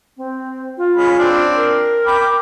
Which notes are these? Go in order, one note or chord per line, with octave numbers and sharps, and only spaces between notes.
C4
F4
G#3 C#4 B5
C4 D4
A#4
G5 B5 D6